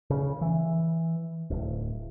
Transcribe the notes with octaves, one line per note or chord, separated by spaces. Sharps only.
C#3
E3
D1